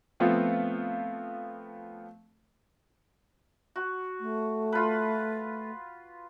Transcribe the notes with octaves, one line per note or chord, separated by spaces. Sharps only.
F3 A3 B3 C4 F4
F#4
A3
F4 B4